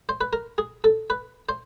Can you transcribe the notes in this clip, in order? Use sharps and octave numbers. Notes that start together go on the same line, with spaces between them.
C5
B4
A#4
G#4
A4
B4
C5